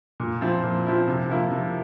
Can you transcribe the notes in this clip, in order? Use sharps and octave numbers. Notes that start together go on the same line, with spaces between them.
A#2
F3 C4 E4
A#2
F3 C4 E4
C3
F3 A#3 E4
C3